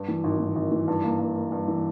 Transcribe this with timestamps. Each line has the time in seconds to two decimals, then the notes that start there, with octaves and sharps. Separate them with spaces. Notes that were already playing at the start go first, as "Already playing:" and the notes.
Already playing: G2
0.08 E3
0.24 G#1
0.40 E3
0.56 G#1
0.72 E3
0.88 G2
1.03 A#3
1.19 G2
1.36 A#3
1.52 G2
1.68 E3